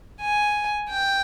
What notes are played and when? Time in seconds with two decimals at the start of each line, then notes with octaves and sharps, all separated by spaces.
0.21 G#5
0.89 G5